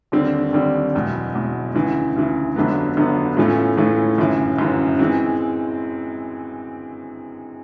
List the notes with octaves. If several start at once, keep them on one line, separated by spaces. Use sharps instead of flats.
D#2 D3 G3 C4
D#2 D3 G3 C4
F#1 E2 B2
F#1 E2 B2
D2 C#3 E3
D2 C#3 E3
G1 F2 D3 F#3 B3
G1 F2 D3 F#3 B3
A2 E3 A3 C#4 F4
A2 E3 A3 C#4 F4
G1 F#2 C#3 E3
G1 F#2 C#3 E3
E3 G#3 C4